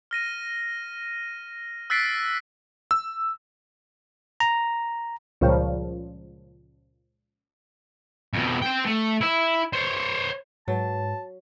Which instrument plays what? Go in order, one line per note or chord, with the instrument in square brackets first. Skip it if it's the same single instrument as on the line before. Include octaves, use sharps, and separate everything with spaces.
[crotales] F6 A#6 D#7
E6 F#6 A6 B6 C7 D7
[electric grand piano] E6
[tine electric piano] A#5
[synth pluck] C#2 A#2 C#3 F3 G3
[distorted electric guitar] F2 B2
C4 G5
A3
E4 E5
C5 C#5
[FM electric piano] G#2 B4 [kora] F#3 [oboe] A5